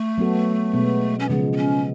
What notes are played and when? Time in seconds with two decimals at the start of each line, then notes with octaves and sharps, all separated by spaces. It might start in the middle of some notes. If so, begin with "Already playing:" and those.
Already playing: A3
0.18 F#3 B3 F#4 A4
0.74 B2 G#3 B3
1.20 C#4
1.30 C#3 F3 G#3 B3
1.53 B3
1.57 C#4